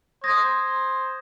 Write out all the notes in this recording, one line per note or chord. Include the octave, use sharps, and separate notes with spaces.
C5 D#6 G#6 A#6